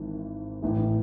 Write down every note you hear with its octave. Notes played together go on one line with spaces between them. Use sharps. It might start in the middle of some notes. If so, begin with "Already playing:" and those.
Already playing: G#1 G#2 E3
A1 A2 E3